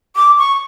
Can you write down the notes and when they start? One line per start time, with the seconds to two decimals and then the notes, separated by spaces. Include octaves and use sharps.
0.16 D6
0.38 C#6